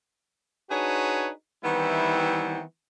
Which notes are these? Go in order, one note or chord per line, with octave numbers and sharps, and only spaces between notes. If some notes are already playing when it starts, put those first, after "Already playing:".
D4 D#4 F#4 G#4 B4 C#5
D#3 E3 G3 B3 C4 E4